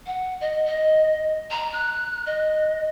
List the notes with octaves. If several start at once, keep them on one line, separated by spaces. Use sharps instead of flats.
F#5
D#5
D#5
A#5
F#6
D#5